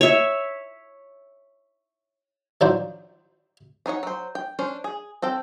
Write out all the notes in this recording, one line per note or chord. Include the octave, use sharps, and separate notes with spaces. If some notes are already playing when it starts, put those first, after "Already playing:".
C#5 E5
D#3 F3 F#3 D4 D#4 C5
D4 D#4 C#5 F#5
F#3 C5
G5
C#4 D4 C5
G#4
C4 A4 G5